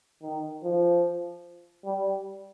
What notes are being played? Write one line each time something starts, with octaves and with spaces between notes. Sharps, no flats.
D#3
F3
G3